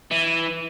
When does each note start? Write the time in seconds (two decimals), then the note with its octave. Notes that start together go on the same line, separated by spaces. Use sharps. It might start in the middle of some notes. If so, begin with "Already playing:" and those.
0.11 E3